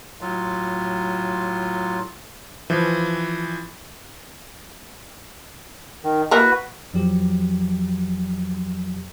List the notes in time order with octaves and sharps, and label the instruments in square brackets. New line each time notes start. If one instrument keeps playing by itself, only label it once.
[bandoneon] A2 F#3 F4
[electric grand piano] E3 F3
[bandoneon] D#3
[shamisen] A#3 E4 A#4 [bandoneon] F#4 B4
[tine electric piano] F2 F3 F#3 G4